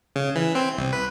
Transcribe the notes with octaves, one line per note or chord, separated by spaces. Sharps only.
C#3
E3
C4
C2
B4